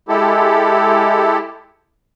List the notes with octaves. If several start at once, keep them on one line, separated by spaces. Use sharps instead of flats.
G#3 E4 G4 A4